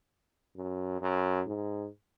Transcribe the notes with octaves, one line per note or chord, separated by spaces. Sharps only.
F#2
F#2
G#2